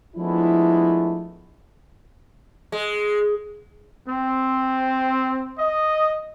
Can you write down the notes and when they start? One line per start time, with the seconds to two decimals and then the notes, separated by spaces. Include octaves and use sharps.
0.16 F3 G#3 A3 B3 D4 E4
2.72 G#3
4.07 C4
5.58 D#5